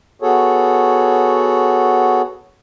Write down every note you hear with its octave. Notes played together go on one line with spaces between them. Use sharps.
B3 F#4 G#4 A4 C#5